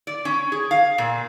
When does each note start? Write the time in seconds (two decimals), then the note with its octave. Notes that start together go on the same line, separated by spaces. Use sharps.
0.07 D5
0.25 C#4
0.52 G#4
0.71 F5
0.98 A#2